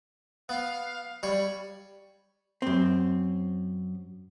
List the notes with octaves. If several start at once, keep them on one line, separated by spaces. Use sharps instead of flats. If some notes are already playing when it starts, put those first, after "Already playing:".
B3 F5
G3 C#5 B5
F#2 C4